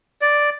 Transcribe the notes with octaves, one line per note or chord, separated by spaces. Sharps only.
D5